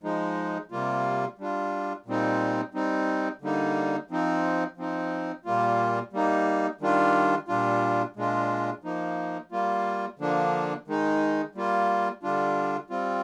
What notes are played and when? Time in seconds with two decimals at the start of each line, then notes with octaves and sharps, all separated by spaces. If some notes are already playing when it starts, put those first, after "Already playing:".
0.03 F3 G#3 D#4
0.71 C3 G3 A#3 F4
1.39 G3 D4 F4
2.06 A#2 G3 C4 D#4
2.74 G3 C4 D#4
3.42 D3 G3 A#3 D#4
4.10 F3 C4 D#4
4.77 F3 C4 D#4
5.45 A#2 G3 A#3 F4
6.13 G3 A#3 D#4
6.81 D#3 G3 D4 F4
7.48 A#2 G3 D4 F4
8.16 A#2 G#3 D4 F4
8.84 F3 A#3 D#4
9.51 G3 A#3 F4
10.19 D3 F3 A#3 D4
10.88 D#3 G#3 D#4
11.55 G3 A#3 F4
12.23 D3 G3 D4 F4
12.90 G3 C4 F4